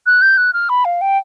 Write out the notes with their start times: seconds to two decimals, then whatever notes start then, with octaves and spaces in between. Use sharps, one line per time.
0.06 F#6
0.22 G6
0.37 F#6
0.53 F6
0.69 B5
0.85 F5
1.01 G5